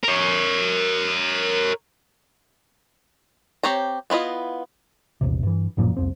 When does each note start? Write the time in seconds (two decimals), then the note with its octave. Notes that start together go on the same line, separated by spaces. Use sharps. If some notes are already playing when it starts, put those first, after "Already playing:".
0.04 A#4 C#5
3.63 C4 G4 C#5 A#5
4.10 B3 E4 F4 D#5
5.21 A#1 E2 C3
5.43 G2 E3
5.77 A1 F#2 A#2 F3
5.97 C2 F2 C4